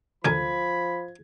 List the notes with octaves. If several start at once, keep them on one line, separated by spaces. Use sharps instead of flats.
D2 F3 A#4 G#5 B5 G#6